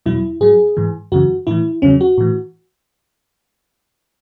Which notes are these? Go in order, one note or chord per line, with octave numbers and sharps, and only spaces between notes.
E2 B2 F#3 E4
G#2 F#3 G#4
G#2 E3
F#2 C#3 E3 F#4
A2 E3 E4
E2 C#3 F#3 C#4
F#4
A2 E3